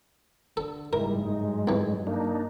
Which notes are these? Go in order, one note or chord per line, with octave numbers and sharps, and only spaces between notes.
D3 A4
F#1 G#2 G3 G#3 E4 A#4
G2 F#3 D#4
C2 E3 A3
A#3 D4 D#4